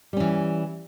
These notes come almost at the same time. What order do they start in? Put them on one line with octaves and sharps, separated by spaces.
G3 C#4 E3